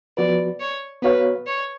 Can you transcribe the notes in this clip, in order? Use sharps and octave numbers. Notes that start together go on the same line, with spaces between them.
F3 B3 F#4 B4 D5
C#5
B3 F#4 B4 C#5 F5
C#5